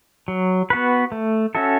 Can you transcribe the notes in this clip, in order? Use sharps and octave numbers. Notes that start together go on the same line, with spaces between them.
F#3
B3 F#4 B4
A3
C#4 F#4 A4 E5